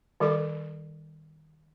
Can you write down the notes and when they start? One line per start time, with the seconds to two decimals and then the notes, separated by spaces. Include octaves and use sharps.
0.20 D#3 G3 A4 D6